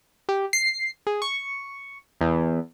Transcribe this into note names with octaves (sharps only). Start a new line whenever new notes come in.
G4
C7
G#4
C#6
E2